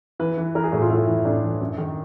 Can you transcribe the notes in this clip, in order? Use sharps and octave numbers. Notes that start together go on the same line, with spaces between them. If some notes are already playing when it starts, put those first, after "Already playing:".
E3 B4
E3
E3 A#4
G#4
A2 F#4
F4
A2 E4
E3
A2 D4
E3
F#2
D#3